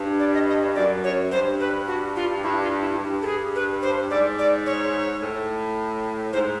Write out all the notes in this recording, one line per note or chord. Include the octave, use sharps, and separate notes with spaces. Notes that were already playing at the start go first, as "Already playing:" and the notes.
Already playing: G2
D5
D#5
D#5
F#2 D5
F#2 C#5
G2 C5
B4
F#4
F4
G2 E4
F4
E4
G2
A4
G#4
B4
C5
G#2 D5
D5
C#5
A2
G#2 C5